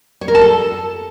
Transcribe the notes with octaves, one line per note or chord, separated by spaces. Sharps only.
C#5
A#4
A5
A4